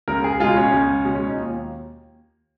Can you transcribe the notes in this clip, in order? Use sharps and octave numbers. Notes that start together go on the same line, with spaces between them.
C#2 A#4
G#4
B2 G#3 F4
C#4
C#2
B2 G#3
C#4
D#4
D#2 F4